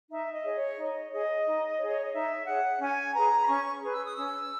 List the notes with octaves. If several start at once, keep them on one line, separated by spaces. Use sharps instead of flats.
D#4 E5
D#5
G#4 C#5
C#5
D#4 D#5
G#4 C#5 D#5
D#4
C#5
G#4
C#5
D#5
D#4 E5
G#4 C#5 F#5
C#4 G#5
G#4 B4 A#5
B5
C#4 C#6
G#4 B4
E6
D#6
C#4 E6